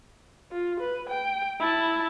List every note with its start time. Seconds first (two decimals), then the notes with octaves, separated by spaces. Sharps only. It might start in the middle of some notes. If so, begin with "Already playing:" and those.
0.52 F4
0.81 B4
1.10 G5
1.60 E4 A5